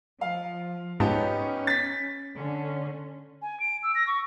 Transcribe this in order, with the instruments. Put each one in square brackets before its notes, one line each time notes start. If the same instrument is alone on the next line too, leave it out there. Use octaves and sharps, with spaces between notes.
[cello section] F3 [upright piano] F5
[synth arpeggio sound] G#2 F4 A5 [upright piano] B3 D#4 G4 [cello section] C#4
[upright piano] A6 B6
[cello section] D3 C#4
[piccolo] G#5
D7
E6
A#6
C#6